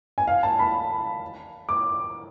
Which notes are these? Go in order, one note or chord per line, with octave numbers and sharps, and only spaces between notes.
G#5
F5
A5
B5
D6